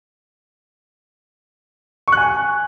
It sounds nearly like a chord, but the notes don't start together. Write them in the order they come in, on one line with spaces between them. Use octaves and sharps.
C#6 F#6 G#5